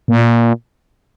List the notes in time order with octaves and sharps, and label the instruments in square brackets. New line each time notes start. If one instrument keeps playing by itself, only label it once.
[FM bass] A#2